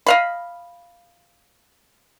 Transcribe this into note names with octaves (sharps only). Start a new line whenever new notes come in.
D#5 F5 B5